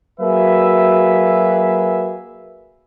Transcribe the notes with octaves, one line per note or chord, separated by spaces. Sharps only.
F#3 A#3 F#4 G#4 B4 E5